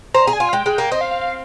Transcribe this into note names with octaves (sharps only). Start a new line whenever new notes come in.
C5 A#5
G#4
G#5
F4
F5
G#3 G5
G#3
A#3
C4 D#5
F5
F5
F5